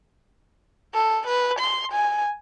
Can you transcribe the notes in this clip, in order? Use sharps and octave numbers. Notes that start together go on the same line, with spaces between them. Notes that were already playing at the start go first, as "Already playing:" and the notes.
A4
B4
C6
G#5